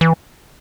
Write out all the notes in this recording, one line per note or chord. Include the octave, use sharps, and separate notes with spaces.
E3